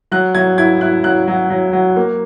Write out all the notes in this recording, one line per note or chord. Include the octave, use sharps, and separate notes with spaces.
F#3 F#6
F#3 G#6
E4 G#6
E4 F#6
F#3 F#6
F#3
F#3
F#3
A#3